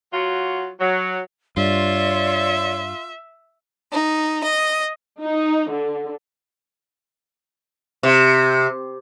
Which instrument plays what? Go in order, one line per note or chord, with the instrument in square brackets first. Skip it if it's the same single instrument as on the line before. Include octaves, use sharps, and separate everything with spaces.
[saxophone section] F#3 F4 F#4
F#3
[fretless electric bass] G2 [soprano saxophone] F4 [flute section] C#5 D5 C6 [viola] E5
[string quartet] D#4
D#5
[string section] D#4
D3
[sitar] C3